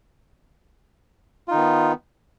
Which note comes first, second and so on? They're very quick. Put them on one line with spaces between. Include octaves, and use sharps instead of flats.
F4 D#4 D#3 B3